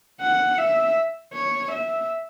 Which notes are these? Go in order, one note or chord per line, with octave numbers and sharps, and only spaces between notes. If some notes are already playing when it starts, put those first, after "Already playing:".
F#5
E5
C#5
E5